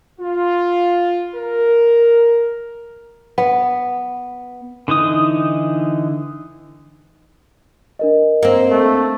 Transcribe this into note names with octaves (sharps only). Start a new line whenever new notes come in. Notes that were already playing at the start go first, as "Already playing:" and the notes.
F4
A#4
B3
D3 E3 D#4 D#6
D4 A#4 D#5
A#3 C4
A3